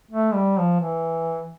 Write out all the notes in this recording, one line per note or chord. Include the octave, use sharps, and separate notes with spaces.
A3
G3
F3
E3